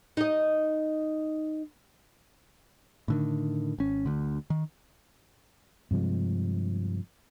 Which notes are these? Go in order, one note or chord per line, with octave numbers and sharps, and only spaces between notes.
D#4 D#5
A2 D3 D#3
G#1 C#4
D2 D3
D#3
G2 C3 F3 G#3